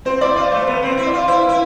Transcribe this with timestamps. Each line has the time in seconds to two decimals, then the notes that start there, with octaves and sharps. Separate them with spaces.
0.05 C4 C5
0.21 E4 D5
0.36 F4 D5
0.51 A3 C5
0.67 B3 B4
0.82 C4 C5
0.97 E4
1.07 D5
1.13 F4
1.28 E4 C5
1.43 B4
1.48 E4